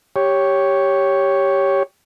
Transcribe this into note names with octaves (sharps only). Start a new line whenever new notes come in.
G4 C#5